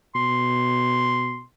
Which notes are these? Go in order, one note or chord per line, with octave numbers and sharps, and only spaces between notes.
B2 C6